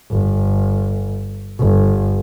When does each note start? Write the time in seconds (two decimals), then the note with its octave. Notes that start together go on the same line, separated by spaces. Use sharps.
0.11 G1
1.60 G1